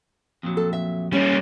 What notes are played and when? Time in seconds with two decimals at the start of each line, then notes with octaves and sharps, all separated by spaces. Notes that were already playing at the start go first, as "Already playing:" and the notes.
0.43 F2 A#2 F#3
0.57 A4
0.73 E5
1.13 G3 A#3 C#4